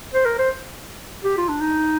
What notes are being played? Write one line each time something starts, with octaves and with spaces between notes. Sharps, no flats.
C5
A#4
C5
G4
F4
D4
D#4